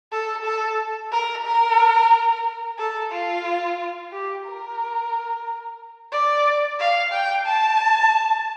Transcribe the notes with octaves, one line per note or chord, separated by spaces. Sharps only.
A4
A4
A#4
A#4
A4
F4
G4
A#4
D5
F5
G5
A5